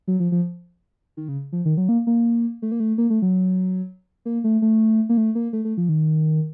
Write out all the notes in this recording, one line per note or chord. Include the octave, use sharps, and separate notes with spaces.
F#3
F3
F3
D#3
C#3
F3
D#3
F#3
A#3
A#3
A3
A#3
A3
A#3
A3
F#3
A#3
A3
A3
A#3
A3
A#3
A3
A3
F3
D#3